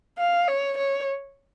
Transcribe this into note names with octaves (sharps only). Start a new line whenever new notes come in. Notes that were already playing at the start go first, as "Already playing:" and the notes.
F5
C#5
C#5